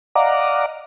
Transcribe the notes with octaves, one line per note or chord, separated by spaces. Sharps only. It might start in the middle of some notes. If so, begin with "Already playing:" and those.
D5 D#5 F5 F#5 A#5 D6